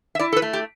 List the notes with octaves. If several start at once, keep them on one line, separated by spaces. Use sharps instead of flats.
E5
E4 D5
A4
B4
A3
G4